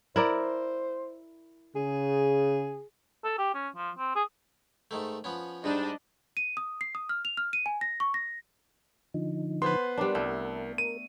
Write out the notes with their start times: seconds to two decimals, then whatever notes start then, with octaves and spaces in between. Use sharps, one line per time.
0.16 E4 A#4 C5 D5
1.76 C#3 G#4
3.24 A4
3.38 G4
3.54 C#4
3.76 F3
3.98 C4
4.15 G#4
4.91 G#2 D#3 A3
5.24 F3 B3 C#4
5.64 G#2 G3 D4 D#4 D#5
6.37 D#7
6.57 D#6
6.81 C7
6.95 D#6
7.09 F6
7.25 F7
7.37 F6
7.53 D#7
7.66 G#5
7.81 A#6
8.00 C#6
8.14 A#6
9.14 D3 F3 D#4
9.62 B3 B4 C5 C6
9.98 G3 D4 A#4
10.15 C2 A3
10.78 A#4 D#7